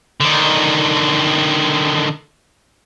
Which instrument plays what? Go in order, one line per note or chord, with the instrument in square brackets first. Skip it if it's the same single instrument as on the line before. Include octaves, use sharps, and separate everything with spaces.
[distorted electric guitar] D3 D#3